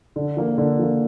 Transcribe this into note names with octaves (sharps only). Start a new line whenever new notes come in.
D3
F3 A#3
D3
F3 A#3